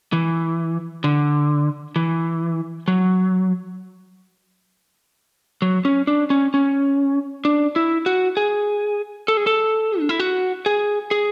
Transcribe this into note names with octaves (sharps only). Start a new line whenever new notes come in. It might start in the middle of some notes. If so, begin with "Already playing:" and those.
E3
D3
E3
F#3
F#3
C#4
D4
C#4
C#4
D4
E4
F#4
G#4
A4
G#4
A4
D4
E4
F#4
G#4
G#4